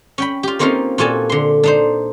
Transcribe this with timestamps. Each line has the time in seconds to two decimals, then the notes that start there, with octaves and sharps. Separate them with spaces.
0.18 C#4 G5 B5
0.43 F4 G4
0.59 A#3 C4 C#4 D#4 F4 A#4
0.98 A#2 F4 F#4 A4 G#5 A5
1.30 D3 C6
1.63 D4 D#4 C5